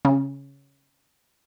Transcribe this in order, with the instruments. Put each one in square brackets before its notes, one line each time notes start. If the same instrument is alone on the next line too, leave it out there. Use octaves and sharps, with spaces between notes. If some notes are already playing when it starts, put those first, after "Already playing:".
[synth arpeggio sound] C#3